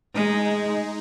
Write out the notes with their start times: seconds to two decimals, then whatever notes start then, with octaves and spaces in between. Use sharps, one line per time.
0.14 G#3 D#4